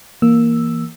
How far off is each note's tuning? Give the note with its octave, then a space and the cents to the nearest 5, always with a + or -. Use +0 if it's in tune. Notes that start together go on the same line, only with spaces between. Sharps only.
E3 +0 A#3 +0 E6 +0